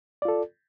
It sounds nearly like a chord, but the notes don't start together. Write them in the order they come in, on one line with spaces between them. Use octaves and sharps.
D5 F4 A4